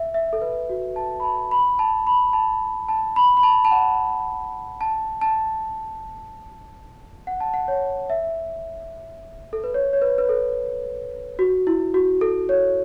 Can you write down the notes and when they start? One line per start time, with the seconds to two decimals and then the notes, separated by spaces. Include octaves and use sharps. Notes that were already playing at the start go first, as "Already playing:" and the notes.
Already playing: E5
0.14 E5
0.33 A4
0.42 B4
0.69 F#4
0.96 A5
1.20 B5
1.24 A5
1.51 B5
1.79 A5
2.07 B5
2.33 A5
2.88 A5
3.16 B5
3.37 B5
3.43 A5
3.65 A5
3.71 F#5
4.81 A5
5.21 A5
7.27 F#5
7.40 A5
7.54 F#5
7.68 C#5
8.10 E5
9.53 A4
9.64 B4
9.74 C#5
9.93 C#5
10.02 B4
10.18 B4
10.29 A4
11.39 F#4
11.67 E4
11.94 F#4
12.21 A4
12.49 C#5